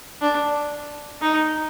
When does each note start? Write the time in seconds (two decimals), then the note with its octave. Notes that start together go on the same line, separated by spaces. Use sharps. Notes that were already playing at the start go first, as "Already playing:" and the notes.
0.22 D4
1.21 D#4